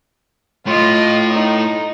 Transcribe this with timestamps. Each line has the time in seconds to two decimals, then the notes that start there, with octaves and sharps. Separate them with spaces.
0.66 A2 F4 D#5
1.32 D#4